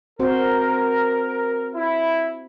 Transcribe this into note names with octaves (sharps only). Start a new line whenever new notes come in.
C4 F#4 A#4 C5
E4